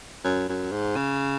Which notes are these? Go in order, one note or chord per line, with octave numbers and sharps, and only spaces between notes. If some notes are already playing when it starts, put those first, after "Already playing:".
F#2
F#2
G#2
C#3